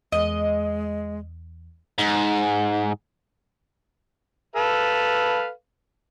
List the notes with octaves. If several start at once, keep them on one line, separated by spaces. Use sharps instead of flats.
E2 G#3 D#5
G#2
A4 B4 F5